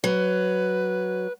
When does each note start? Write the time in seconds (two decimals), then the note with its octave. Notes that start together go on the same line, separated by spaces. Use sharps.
0.04 F#3 B4